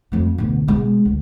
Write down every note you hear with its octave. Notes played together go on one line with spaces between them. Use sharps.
F2 A3
D2 B2
B2 G#3
D2